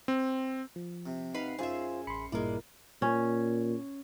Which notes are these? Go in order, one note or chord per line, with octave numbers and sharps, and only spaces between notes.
C4
F3
C3
D#4 B4 F5 F#5 C7
F#2 F4 G#4 C5 E5
A1 B5 C6 C#7
A1 G2 A#2 G#3 E4 A#4 D5
A#2 C#4